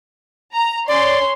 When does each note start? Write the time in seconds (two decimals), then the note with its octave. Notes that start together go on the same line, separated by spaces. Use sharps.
0.53 A#5
0.88 C#4 C#5 D5 C6